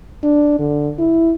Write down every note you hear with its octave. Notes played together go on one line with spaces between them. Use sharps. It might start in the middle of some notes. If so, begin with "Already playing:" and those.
D4
D3
E4